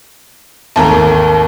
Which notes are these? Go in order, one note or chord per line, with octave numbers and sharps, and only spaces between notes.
G#1 D#2 A3 A5 A#5